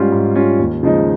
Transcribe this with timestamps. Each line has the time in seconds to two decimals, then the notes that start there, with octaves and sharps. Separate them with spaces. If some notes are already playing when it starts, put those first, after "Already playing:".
Already playing: G#2 G3 C#4 F4
0.12 G#2
0.35 G3 C#4 F4
0.59 D#2
0.83 C#3 F3 G#3 D#4